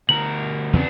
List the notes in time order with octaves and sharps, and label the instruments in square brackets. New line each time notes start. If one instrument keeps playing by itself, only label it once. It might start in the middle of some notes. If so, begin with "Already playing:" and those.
[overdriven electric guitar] D2 A#4 [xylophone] F#7
[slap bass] E2 C#3 C4 [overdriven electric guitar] B3 D4